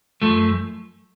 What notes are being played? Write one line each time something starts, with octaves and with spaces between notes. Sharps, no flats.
F#2 F3 A3